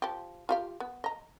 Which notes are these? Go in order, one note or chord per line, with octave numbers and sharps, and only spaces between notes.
F3 G4
F4 G4 F5
B3
D#5 A#5